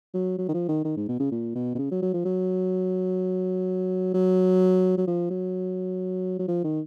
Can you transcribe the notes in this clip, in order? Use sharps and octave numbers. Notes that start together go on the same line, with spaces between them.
F#3
F#3
D#3
F3
D#3
D#3
G#2
B2
C#3
A#2
B2
B2
C#3
F#3
F#3
F3
F#3
F#3
F#3
F3
F#3
F#3
F3
D#3